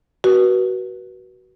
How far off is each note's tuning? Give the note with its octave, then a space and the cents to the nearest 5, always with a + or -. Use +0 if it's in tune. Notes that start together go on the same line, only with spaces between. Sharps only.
F#4 +20 B4 -35